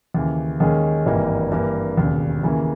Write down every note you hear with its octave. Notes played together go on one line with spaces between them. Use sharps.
D#2 C#3 E3
D#2 D#3 G#3 C#4 G#4
G#1 G2 E3 A#3 D#4
G2 E3 A#3
E1 D#2 C#3
D#2 C#3 E3 A#3